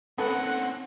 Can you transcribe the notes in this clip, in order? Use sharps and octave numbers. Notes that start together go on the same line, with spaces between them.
D#3 C4 C#4 A4 B4 F#5